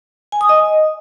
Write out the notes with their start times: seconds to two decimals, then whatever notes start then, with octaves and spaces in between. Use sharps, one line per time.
0.32 G#5
0.41 D#6
0.49 D#5